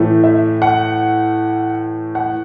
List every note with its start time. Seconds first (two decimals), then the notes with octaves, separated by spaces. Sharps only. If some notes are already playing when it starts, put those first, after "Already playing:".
Already playing: A2 E3 A3
0.24 E5
0.62 F#5
2.15 F#5